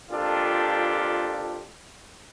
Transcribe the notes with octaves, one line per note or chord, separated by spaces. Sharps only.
F2 A#2 D4 F4 G4 A4